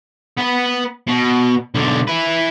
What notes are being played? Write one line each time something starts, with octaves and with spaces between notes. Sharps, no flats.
B3 B4
B2
B1 D3
E4 B4